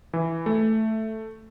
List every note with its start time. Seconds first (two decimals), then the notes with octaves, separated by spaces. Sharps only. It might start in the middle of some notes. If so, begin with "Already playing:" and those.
0.13 E3
0.46 A3